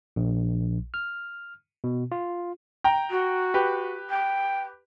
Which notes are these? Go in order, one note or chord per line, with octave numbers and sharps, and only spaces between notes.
A#1
F6
B2
F4
G5 A#5
F#4
G4 B4
G5